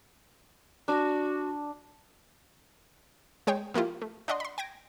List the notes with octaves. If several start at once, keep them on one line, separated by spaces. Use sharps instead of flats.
D4 F#4
G#3 G#4 C#5 G5
F3 A#3 E4 F4 G4
A3
D4 D5 D#5 F#5 C6
B5 C6
G5 G#6 A#6 D7